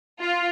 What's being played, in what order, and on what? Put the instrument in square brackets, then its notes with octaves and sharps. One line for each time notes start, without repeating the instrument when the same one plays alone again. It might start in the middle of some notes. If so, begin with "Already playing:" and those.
[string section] F4